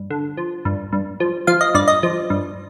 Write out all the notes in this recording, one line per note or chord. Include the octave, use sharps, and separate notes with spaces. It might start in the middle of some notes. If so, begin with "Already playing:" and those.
Already playing: G2
D3
F3
G2
G2
F3
F3 F5
D#5
G2 D5
D#5
F3
G2